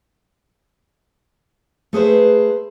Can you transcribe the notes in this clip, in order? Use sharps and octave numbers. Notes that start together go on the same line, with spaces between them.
A3 G#4 B4 C5